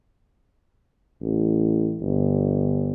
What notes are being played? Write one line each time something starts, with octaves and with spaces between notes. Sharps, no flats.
A1
G1